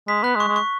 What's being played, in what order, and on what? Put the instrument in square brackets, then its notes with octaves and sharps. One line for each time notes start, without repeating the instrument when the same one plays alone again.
[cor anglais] G#3 [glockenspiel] B6
[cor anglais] B3 [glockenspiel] F#6
[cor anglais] G#3
[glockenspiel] C#6
[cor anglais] G#3
[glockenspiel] C#6